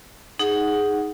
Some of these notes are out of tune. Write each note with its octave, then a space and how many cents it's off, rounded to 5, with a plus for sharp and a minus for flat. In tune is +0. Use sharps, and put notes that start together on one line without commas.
D#4 +0 G#4 +0 F#5 +0